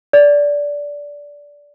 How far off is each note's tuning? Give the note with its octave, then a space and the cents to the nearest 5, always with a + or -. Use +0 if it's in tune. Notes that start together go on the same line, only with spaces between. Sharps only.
D5 -15